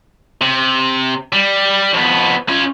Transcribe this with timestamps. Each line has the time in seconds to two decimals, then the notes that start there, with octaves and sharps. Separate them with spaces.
0.41 C3
1.33 G3
1.93 F2 B3
2.49 C#4 F4